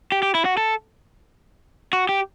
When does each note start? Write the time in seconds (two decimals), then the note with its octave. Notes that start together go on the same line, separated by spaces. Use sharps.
0.12 G4
0.22 G4
0.35 E4
0.45 F#4
0.57 A4
1.93 F#4
2.09 G4